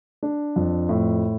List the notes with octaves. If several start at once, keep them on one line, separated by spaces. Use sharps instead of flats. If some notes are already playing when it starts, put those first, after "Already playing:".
D4
F2
A2